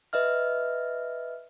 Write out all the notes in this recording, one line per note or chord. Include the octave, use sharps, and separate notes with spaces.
B4 D#5 E5 F6